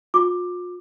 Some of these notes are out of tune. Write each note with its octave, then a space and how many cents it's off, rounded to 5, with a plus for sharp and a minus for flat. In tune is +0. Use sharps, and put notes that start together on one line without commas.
F4 +40 D6 +10